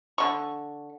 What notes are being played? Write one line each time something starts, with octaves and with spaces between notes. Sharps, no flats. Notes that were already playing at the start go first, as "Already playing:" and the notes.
D3 C#6